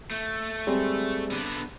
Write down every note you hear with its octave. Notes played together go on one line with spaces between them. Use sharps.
A3
G3 G#3 C4
D3 B3